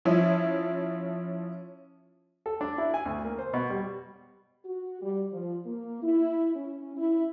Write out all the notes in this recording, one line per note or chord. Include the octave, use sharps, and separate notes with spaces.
F3 C#4 E4
A4
D4
E4
G#5
D2
A#3
C5
B2
G3
F#4
G3
F3
A#3
E4
C#4
E4